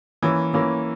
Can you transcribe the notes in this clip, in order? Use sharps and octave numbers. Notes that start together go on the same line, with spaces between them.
E3 A#3 C#4
E3 A#3 C#4